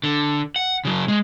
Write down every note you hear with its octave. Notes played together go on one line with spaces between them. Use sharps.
D3
F#5
C#3 F#3
G#3